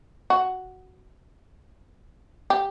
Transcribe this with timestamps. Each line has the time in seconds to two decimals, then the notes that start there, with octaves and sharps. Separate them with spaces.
0.30 F#4
2.50 G4